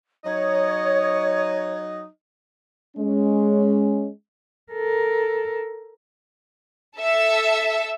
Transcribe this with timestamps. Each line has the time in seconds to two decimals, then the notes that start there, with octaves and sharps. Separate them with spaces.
0.25 F#3 D#4 C#5 D#5
2.96 G#3 C#4
4.73 A4 A#4
6.98 A4 E5